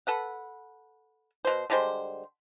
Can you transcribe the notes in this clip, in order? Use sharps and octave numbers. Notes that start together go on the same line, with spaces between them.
A4 B4 F#5
B2 C5
D3 G3 G#3 C5